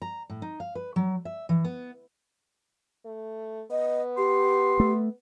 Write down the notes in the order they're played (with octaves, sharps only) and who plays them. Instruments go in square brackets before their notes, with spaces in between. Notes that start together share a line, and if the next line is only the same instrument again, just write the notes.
[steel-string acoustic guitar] A#5
A2
D#4
F5
B4
F#3
E5
E3
B3
[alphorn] A3
[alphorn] B3 [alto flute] D#5
[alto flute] G4 [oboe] C6
[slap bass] A3